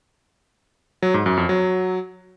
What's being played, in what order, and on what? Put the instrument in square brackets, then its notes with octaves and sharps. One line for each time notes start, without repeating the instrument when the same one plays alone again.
[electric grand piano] F#3
G#2
F#2
F2
F#3